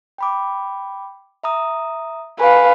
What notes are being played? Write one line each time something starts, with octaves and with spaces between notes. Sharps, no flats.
G5 B5 D6
E5 A#5 D#6
B4 F5 G#5 C#6